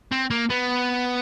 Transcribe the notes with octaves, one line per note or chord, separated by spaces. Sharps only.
C4
A#3
B3